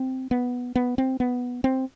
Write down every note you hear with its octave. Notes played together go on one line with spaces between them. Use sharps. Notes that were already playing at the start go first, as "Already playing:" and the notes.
Already playing: C4
B3
B3
C4
B3
C4